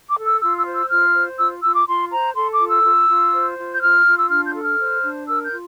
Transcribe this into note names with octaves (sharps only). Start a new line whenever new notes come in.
D6
A4
E6
F4 E6
E6
C5
E6
F4 F6
C5
F4 E6
F4 E6
D6
F4 C6
C5 A#5
A4 C6
D6
F4
E6
F4
F4
C5
F4
G6
F4 F6
F4
E6
D4 F6
G6
A4
F6
C5
D4
A#4 E6
G6
F4